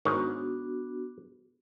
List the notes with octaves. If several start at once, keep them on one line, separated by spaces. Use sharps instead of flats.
G#2 D#3 B3 D4 F#4 C#5